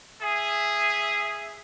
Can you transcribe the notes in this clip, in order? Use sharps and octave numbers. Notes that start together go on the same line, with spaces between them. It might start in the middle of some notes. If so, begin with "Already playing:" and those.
G#4 E5